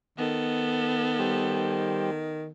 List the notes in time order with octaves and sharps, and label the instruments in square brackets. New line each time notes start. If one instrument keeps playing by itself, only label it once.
[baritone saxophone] D#3 [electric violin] B3 A4
[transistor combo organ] G3 G4 C5